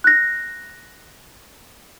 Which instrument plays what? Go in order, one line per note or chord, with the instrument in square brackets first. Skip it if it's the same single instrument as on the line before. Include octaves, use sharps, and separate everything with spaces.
[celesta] F#6 A#6